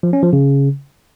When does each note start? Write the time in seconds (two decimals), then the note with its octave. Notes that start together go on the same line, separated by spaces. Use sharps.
0.03 F3
0.13 C#4
0.23 F3
0.33 C#3